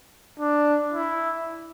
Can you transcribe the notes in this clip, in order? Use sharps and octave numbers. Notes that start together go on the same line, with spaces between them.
D4
E4